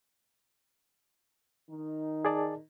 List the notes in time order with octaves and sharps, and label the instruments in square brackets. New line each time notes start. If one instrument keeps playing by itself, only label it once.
[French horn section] D#3 D#4
[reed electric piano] G#4 D5 A5